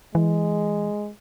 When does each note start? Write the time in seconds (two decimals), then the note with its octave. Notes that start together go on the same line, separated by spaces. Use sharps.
0.15 E3 G#3